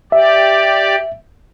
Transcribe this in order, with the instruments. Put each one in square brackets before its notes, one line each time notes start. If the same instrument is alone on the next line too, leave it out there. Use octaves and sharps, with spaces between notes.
[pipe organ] G4 D5 [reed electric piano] E5